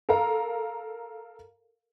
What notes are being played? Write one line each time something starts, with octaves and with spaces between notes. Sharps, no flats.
A4 A#4 F5 A#5